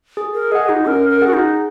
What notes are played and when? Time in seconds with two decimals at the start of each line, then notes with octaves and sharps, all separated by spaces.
0.17 G#4
0.34 A#4
0.52 G#4 D#5 F#5
0.69 D#4
0.86 C#4 A#4
1.10 A#4
1.22 G#4 F#5
1.27 F#4
1.33 D#4